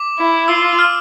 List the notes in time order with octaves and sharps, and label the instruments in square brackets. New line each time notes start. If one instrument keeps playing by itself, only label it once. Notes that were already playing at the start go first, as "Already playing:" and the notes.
Already playing: [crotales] D6
[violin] E4
[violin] F4 [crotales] E6
[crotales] F6